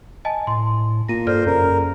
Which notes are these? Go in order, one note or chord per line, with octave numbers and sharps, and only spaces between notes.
D#5 G#5 A5
A2 C6
A#2 A#6 D#7
G2 A4 C5 D5 F6
F#2 C#3 A#4